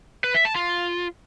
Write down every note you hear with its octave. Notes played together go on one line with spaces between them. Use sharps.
B4
E5
A5
F4